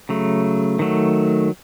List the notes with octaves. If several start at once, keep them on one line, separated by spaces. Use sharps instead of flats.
C#3 F#3 A3
D#3 F#3 A3